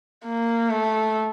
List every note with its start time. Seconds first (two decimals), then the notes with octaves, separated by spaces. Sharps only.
0.25 A#3
0.70 A3